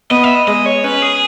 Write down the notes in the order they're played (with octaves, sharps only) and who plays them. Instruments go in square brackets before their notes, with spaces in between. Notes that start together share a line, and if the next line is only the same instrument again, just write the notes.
[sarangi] B3 [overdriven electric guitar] D#5
[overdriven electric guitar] E5
D#5
[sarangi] G#3 [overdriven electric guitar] D#5
[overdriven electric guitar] C#5
[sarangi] C#4 [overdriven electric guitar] B4
[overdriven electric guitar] G#4